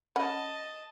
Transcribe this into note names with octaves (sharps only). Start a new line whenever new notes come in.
C#4 D#5 F#5 A5 B5